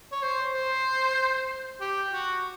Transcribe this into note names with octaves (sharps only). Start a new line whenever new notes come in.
C#5
C5
C5
G4
F#4